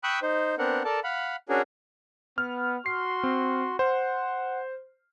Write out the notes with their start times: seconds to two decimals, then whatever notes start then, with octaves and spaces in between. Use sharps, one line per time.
0.04 G5 B5 C#6 D#6 E6 F#6
0.22 D#4 C5
0.58 B3 C4 D4 A#4 F#5
0.85 A4 A#4 D5 A5
1.04 F5 F#5 B5
1.49 C#4 D4 F#4 G#4 A#4
2.38 B3 F6
2.86 F#4 C6 C7
3.23 C4
3.79 C5 F#5